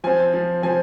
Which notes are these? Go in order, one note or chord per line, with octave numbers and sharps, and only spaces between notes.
F3 C4 G#5
F3 C4
F3 C4 G#5